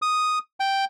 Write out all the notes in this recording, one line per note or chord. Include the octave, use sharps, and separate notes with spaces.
D#6
G5